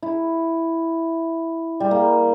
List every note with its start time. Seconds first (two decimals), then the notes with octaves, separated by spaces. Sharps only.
0.02 E4
1.80 G3
1.91 A#3